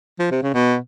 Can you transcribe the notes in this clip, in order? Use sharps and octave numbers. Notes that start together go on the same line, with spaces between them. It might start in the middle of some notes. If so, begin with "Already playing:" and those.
F3
C3
C#3
B2